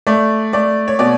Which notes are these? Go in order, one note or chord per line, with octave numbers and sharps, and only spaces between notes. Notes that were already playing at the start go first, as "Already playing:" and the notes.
A3 D5
A3 D5
C#5
B2 D5